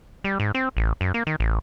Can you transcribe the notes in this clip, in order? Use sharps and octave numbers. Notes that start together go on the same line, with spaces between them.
G3
G#2
C4
A1
F#2
A#3
D#3
A1